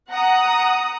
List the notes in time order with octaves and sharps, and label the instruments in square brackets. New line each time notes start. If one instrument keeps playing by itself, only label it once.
[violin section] F#5 A#5 D#6